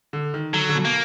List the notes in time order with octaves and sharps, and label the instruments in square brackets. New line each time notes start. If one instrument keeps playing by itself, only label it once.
[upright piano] D3
D#3
[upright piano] D3 [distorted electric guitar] F#3
[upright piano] D3
B2
[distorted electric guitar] A#3